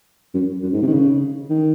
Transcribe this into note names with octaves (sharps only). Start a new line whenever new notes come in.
F#2
F#2
G#2
C3
D#3
C#3
D#3